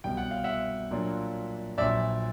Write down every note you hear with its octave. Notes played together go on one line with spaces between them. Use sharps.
C2 B2 G3 G5
F#5
F5
E5 F#5
A#2 F#3 A#3 D4 F4
A#1 A#2 F#3 D5 E5